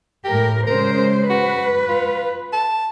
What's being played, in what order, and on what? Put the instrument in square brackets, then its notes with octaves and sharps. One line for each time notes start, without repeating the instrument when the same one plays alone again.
[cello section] A2 A#4 [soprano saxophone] G4
[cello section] C#3 G#3 C5 [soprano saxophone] A#4
[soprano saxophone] F#4 [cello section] B4
[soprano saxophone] F4
A5